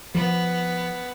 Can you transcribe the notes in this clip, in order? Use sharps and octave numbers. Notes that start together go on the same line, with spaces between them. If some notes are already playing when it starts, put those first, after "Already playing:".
F3 B3